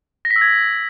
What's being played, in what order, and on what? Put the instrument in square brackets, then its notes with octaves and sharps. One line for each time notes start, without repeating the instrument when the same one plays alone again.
[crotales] A#6
B6
E6
G#6